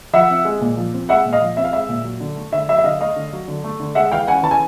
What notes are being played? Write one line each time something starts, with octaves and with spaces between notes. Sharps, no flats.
F3 E5 F#5
C4
G#3
A#2
F3
C4
G#3 E5 F#5
A#2
D#5 F5
F3
C4 E5
F5
G#3 E5
A#2
F#3
D3
A3
D3 E5
F#3 E5
E5
D3 D#5 F5
A3 D#5 F5
D3
F#3
D3
A3
D3
G#3 E5 F#5
E3 F5 G5
C#4 F#5 G#5
E3 A5
G#5